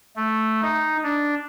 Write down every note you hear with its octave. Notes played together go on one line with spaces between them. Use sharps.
A3
D#4
D4